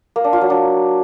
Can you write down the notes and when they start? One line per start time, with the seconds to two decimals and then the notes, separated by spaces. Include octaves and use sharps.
0.16 A#3
0.24 D4
0.33 F4
0.41 F#3
0.50 D4